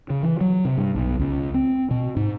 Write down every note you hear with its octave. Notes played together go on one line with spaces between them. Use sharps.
C#3
E3
F#3
C3
G2
B1
C#2
C4
B2
G#2